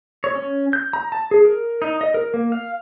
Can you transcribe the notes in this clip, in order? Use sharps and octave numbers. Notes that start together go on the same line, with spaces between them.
C#5
C#4
G6
A#5
A5
G#4
A#4
D#4
D#5
A#4
A#3
F5